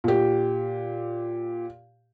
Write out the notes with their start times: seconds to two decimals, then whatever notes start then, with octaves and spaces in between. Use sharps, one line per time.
0.04 A#2 G4